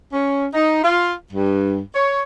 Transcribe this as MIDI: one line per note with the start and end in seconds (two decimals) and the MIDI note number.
0.13 0.46 61
0.53 0.80 63
0.83 1.13 65
1.32 1.79 43
1.94 2.23 73